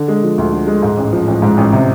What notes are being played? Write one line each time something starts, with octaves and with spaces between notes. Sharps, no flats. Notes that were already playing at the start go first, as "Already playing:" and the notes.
Already playing: D3
G#3
F3
D2
D3
G#3
G#2
A1
F3
A1
G#2
A1
C3